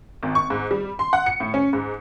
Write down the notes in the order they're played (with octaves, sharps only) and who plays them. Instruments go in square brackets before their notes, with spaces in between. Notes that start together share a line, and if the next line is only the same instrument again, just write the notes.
[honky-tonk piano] G#1
C#6
G#2
G3
C6
F#5
C#7
A2
C#4
G#2